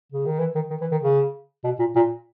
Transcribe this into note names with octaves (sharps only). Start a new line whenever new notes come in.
C#3
D#3
E3
D#3
D#3
E3
D#3
C#3
B2
A#2
A#2